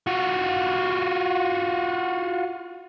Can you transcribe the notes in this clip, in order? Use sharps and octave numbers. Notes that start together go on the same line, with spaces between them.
F4 F#4